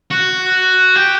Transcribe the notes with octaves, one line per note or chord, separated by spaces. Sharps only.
F#4
G4